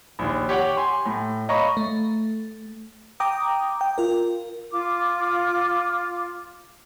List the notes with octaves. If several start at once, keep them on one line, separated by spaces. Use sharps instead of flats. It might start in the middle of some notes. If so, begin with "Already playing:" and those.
A#1 D#2
G4 C#5 F#5 G5
G#5 C6
A2
C#5 D#5 F5 A#5 B5 C#6
A3
G5 A#5 D6 D#6
G5
F4 A#4
F4 D6